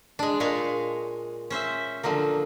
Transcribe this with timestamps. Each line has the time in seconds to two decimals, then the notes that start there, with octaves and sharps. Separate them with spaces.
0.19 G#3 D4
0.40 A#2 G#3 C#5 F5
1.50 C#4 C5 E5
2.03 D3 F3 F#3 A#3